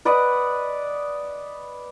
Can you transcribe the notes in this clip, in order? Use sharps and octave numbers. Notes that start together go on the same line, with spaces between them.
B4 D5 D#5 F#5